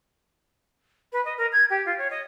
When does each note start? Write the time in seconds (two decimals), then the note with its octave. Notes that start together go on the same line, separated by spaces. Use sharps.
1.12 B4
1.25 D#5
1.37 A#4
1.52 G#6
1.70 G4
1.85 F4
1.98 C#5
2.10 D#5